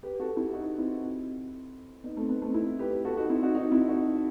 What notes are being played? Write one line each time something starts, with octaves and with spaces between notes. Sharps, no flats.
G4 B4
F#4 A4
E4 G4
D#4 F#4
C4 E4
B3 D#4
A3 C4
B3
A3 C4
C4 E4
G4 B4
F#4 A4
D#4 F#4
C4 E4
D#4 F#4
D#4 F#4
C4 E4
D#4 F#4